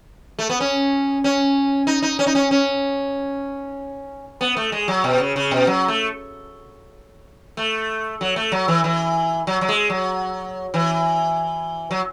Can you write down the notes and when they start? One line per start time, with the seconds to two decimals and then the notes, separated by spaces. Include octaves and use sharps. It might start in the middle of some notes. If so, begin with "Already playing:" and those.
0.39 A3
0.50 B3
0.61 C#4
1.24 C#4
1.87 D#4
2.02 D#4
2.19 C#4
2.27 D#4
2.35 C#4
2.51 C#4
4.41 B3
4.57 A3
4.72 G#3
4.88 F#3
5.04 B2
5.20 C#3
5.36 C#3
5.51 B2
5.67 F#3
5.88 A3
7.57 A3
8.21 F#3
8.36 A3
8.52 F#3
8.68 E3
8.84 E3
9.47 F#3
9.61 F#3
9.69 G#3
9.90 F#3
10.74 E3
11.91 F#3